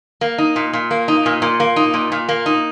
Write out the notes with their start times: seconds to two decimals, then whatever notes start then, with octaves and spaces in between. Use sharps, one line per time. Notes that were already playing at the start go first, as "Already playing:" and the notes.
0.21 A#3
0.38 D#4
0.56 A#2
0.73 A#2
0.91 A#3
1.08 D#4
1.26 A#2
1.42 A#2
1.60 A#3
1.76 D#4
1.94 A#2
2.12 A#2
2.29 A#3
2.46 D#4